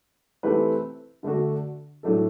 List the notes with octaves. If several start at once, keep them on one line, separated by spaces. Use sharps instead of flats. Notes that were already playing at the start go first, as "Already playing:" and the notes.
E3 A3 C4 G4 B4
D3 A3 D4 F#4
A2 F#3 A3 D4 A4